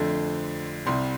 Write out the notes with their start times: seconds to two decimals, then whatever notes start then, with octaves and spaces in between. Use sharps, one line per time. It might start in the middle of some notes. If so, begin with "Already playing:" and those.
Already playing: F2 D3 A3 C5
0.86 C2 C3 G3 C6